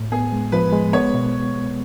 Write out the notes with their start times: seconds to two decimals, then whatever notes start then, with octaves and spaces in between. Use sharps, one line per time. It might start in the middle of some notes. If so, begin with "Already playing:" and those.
Already playing: A2
0.12 B3 G#4
0.33 G#3
0.52 F3 B4
0.72 G#3
0.93 B3 C#5
1.14 B2